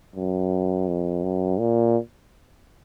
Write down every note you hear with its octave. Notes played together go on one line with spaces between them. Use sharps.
F#2
F2
F#2
A#2